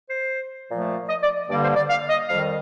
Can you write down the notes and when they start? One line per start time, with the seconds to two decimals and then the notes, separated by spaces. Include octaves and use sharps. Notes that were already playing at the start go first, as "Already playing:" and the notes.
0.10 C5
0.70 A#2 F3 A3
1.09 D#5
1.23 D5
1.49 G2 D3 G3 A#3 D5
1.62 C5
1.76 D5
1.89 F5
2.09 D#5
2.29 F2 D#3 G3 F5